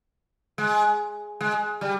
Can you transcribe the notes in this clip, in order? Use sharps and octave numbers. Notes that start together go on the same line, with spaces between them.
G#3
G#3
G3